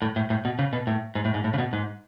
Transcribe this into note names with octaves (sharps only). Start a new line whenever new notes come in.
A2
A2
A2
B2
C#3
B2
A2
G#2
A2
G#2
A2
C#3
B2
G#2